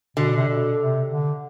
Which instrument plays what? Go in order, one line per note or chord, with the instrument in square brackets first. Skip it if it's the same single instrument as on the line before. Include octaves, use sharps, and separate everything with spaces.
[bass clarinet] B2 [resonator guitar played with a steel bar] D3
[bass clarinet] C3
B2
C3
D3